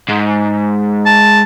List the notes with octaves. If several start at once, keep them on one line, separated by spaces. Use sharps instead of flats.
G#2
A5